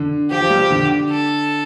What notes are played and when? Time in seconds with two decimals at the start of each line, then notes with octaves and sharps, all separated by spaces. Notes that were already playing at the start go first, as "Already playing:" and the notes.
Already playing: D3
0.30 F3 G4
0.40 F3
0.50 G3
0.60 F3
0.70 D3
1.10 A4